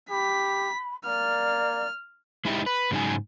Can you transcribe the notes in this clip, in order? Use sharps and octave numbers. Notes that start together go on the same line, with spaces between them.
G4 B5 B6
A#3 D5 F6
G#3 D#4 E4 G4
B4
G#2 C#3 F#3 G#3 D#4 G#5